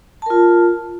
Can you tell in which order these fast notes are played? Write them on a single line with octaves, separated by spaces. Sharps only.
A5 A#4 F4